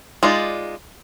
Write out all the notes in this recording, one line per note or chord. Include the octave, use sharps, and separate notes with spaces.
G#3 D#4 F4 D5